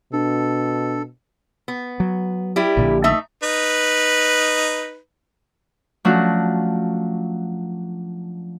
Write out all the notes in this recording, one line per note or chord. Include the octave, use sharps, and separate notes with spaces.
B2 D4 A4
B3
F#3
G3 E4 G4
A#1 A#2 D3
A3 D#4 E5
D#4 B4
F3 F#3 A3 C#4 D4 F#4